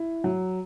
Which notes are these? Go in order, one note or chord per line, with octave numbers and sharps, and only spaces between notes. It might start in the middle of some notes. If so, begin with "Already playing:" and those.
Already playing: E4
F#3